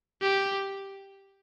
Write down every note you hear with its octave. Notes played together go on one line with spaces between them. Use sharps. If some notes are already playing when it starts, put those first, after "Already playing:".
G4